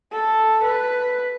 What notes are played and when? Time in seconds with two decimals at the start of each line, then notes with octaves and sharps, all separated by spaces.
0.12 A4
0.64 B4